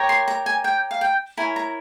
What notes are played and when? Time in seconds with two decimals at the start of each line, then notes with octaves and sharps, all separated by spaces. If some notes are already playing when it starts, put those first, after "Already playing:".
Already playing: G4 A#4 C#5
0.09 C6
0.28 A#5
0.46 G#5
0.64 G5
0.91 F5
1.01 G5
1.37 E4 A#4 C#5 G#5
1.56 A#5